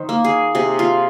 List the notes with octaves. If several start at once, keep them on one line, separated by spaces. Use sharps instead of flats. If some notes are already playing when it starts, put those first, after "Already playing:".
Already playing: D#3 C5
A#3
G#4
C3 G#4
F4